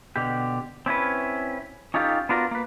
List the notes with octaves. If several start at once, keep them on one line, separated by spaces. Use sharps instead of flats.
B2 D3 G4
C4 C#4 E4 B4
C#4 D#4 F4 G4 A4
B3 D4 F4 F#4 A#4
A#3 B4